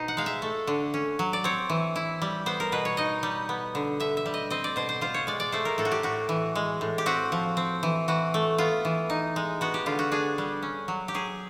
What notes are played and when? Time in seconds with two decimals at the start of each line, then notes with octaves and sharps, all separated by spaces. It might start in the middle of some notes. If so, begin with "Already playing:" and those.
Already playing: B2 D#4 C5
0.08 F#5
0.17 G#3 F5
0.26 E5
0.42 A3
0.67 D3
0.94 C#4
1.19 F#3
1.33 D5
1.44 C4 C#5
1.70 E3
1.96 E4
2.22 G3
2.46 B3 C5
2.60 A#4
2.72 B2 B4
2.85 C#5
2.97 D#4 D#5
3.23 G3
3.49 B3
3.75 D3
4.00 D3 E5
4.17 E5
4.26 G3
4.34 D#5
4.50 C4 D#5
4.64 D5
4.76 B2 C5
4.89 C5
5.01 F4 C5
5.14 C#5
5.27 G#3 D5
5.40 D5
5.52 A3 C5
5.65 A#4
5.78 A2 A4
5.85 F#4
5.92 G4
6.03 A2 F#4
6.29 E3
6.55 G#3
6.81 A2
6.98 G4
7.06 C4 F#4
7.32 F3
7.57 C4
7.83 E3
8.08 E3 F#4
8.34 A3
8.58 B3 F4
8.85 E3
9.10 D#4
9.36 G#3
9.61 B3 F#4
9.74 G4
9.86 D3 F4
9.99 F#4
10.12 D4 G#4
10.38 G3
10.63 C#4
10.88 F#3
11.08 G4
11.14 F#3 G#4